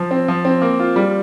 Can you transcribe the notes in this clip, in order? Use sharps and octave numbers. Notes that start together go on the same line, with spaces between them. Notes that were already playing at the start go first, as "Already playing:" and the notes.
Already playing: F3
C4
F3
C4
A#3
F4
G3